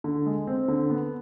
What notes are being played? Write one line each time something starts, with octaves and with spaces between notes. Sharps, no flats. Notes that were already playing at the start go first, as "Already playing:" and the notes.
D3
G#3
C4
D3
B3